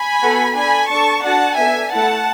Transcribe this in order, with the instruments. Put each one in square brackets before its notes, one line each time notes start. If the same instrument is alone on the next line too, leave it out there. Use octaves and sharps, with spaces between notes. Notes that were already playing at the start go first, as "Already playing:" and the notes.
Already playing: [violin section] G#5 B5
B3 F#4 A4
D4 A4 G#5 B5
D4 A4 A5 C#6
D4 F#4 A4 F#5 A5
B3 D4 A4 E5 G#5
A3 E4 A4 F#5 A5